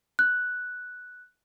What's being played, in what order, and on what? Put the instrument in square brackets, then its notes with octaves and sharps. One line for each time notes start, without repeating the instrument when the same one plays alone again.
[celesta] F#6